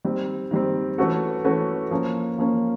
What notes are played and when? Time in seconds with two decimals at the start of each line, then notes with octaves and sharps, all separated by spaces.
0.05 D#3 G3 C4
0.51 D#3 G3 C4
0.98 E3 A3 C#4 F#4 A4
1.44 E3 A3 C#4 F#4 A4
1.91 F3 A#3 C#4
2.38 F3 A#3 C#4